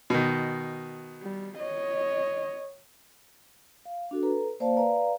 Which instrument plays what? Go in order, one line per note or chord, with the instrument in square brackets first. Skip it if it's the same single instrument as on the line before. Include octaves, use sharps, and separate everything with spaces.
[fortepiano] B2 D#3
[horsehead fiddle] G3
C#5 D#5
[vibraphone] F5
D4 F#4 A4
A4 B4 A#5
A#3 C5 D5 F5 A5
B4 D5 F5 A#5